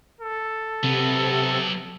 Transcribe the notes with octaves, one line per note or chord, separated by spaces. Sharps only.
A4
C3 F#3 B3